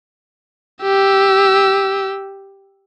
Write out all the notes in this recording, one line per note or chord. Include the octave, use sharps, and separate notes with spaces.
G4 E6